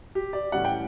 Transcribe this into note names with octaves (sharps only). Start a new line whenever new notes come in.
G4
D5
A2 E3 G3 C#4 F#5
G5